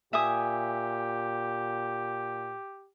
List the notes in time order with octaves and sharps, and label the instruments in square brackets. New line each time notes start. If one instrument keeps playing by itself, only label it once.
[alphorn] A#2 [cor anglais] G4 [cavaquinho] E5 G#5 D#6